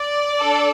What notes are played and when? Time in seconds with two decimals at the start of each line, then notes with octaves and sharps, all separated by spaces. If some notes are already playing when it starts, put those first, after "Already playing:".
Already playing: D5
0.40 D4 A4